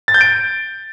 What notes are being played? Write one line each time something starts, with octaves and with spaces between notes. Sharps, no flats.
A6
G6
D7